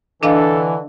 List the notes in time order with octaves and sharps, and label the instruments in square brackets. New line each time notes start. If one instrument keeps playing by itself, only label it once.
[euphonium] D3 [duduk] E3 [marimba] D4 D#5 F5 [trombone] A4